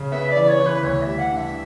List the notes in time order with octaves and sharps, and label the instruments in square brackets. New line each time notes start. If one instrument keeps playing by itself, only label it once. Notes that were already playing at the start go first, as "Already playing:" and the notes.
Already playing: [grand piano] C#3
[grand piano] B3 [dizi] E5
[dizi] D5
[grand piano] E3
[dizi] C#5
[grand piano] E3
[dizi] B4
[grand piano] D2 [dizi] C#5
[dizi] E5
[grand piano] G3
[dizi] F#5
[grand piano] D3
[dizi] E5